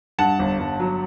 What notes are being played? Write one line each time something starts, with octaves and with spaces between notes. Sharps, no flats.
G2 F#5 A5
G1
G1
F#3